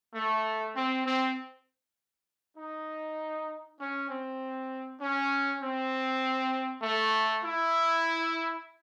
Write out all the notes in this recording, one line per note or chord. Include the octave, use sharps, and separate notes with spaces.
A3
C4
C4
D#4
C#4
C4
C#4
C4
A3
E4